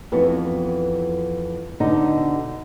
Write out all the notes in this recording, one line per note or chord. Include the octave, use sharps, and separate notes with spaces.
F2 E3 B3 F#4
B2 D3 D#4